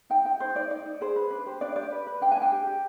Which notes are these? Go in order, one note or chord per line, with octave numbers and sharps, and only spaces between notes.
D#4 G5
D#4 G5
D#4 C5
D#4 D5
D#4 D5
D#4
G#4 C5
B4
D4 B4
G4 C5
D4 D5
G4 D5
B4
B4
D4 G5
G#5
D4
G5
G4
G4